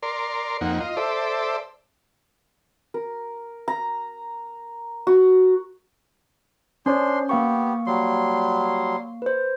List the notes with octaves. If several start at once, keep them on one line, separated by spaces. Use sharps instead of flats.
A#4 D5 C6
F2 A#3 D#4 F#5
F4 D#5
A4 C5 D5 E5
A#4
A#5
F#4
C#4 D4 C5 C#5 C6
A#3 B3 G4 F5 C#6
F#3 G3 C6
B4 C5